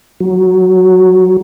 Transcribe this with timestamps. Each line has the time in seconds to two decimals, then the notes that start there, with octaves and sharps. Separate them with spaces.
0.20 F#3